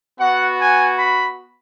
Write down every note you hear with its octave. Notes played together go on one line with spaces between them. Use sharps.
B3 F#4 F#5
G#5
B5